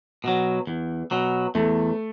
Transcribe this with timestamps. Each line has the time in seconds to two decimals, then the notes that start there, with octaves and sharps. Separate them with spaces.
0.24 B2 F#3
0.67 E2
1.11 B2 F#3
1.55 E2 A3